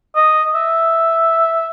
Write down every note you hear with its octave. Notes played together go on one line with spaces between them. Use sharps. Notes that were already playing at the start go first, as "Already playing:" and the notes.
D#5
E5